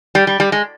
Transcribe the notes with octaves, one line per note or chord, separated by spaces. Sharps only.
G3
G3
G3
G#3